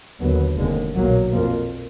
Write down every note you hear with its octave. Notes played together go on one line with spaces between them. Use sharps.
D#2 D3 F#3 B3
F1 D#2 D3 G#3
B1 A#2 F#3 A#3
F2 F3 A#3